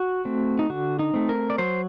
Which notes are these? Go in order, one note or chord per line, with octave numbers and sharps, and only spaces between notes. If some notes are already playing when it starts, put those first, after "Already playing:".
Already playing: F#4
A3 C4
D#4
D3 F#4
D#4
A3 C4
A#4
D5
F#3 C5